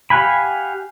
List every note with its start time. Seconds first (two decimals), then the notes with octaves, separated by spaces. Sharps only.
0.10 G4 F5 F#5 G#5 B5